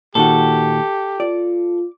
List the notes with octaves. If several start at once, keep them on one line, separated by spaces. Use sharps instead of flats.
A#2 D#3 F#4 G4 A4
F4 D5